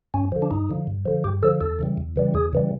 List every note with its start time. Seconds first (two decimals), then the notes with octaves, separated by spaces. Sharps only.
0.14 G2 C#4
0.32 D3 F3
0.42 D4
0.51 G2 D#4
0.69 D3 F3
0.87 G2
1.06 D3 F3
1.24 G2 G4
1.43 D3 F3 A4
1.61 E2 A4
1.79 C#3 E3 G3
1.98 E2
2.16 C#3 E3 G3
2.34 E2 G#4
2.53 C#3 E3 G3